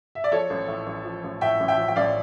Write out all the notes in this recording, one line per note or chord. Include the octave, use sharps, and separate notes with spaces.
E5
D5
F3 A4 C#5
A1
A2
A1
F3
A1
A2 E5 G5
A1
E5 G5
F3
G5
A1 D5 F5